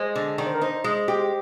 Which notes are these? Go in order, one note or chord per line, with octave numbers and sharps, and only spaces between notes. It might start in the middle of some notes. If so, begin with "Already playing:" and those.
Already playing: G#3 C5
D3
D#3 D5
C5
A#4
D#4 C5
G#3
G4